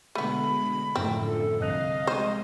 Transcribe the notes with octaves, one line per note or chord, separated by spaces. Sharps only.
B2 D3 G#3 A3 B3 B5
F#2 A2 D3 F3 C4
A4
C2 D#5 F5 F#6 F7
C3 G#3 C5